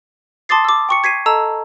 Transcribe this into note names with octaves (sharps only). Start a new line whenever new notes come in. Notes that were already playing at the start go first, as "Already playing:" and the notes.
A5 C6 D6 D#6 A6 C7
D6 E6
G5 C#6 C#7
G#6 B6 C7 D#7
A4 D#5 A5 A#5 E6